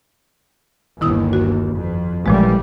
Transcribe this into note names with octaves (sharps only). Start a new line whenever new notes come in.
G1 D#2 D#3 E4 D#6
F#4
F2
A1 A#2 F3 G3 G#3